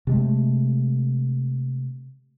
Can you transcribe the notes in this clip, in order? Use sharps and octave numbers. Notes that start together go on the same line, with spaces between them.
C3 G#3 A3